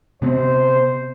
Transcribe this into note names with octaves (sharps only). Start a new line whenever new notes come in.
C3 B3 C4 C5